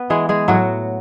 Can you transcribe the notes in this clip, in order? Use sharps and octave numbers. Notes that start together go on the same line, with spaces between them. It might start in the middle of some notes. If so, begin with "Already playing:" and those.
Already playing: B3 B4
E3 G#3 G#4
G#3 G#4
A2 F#3 F#4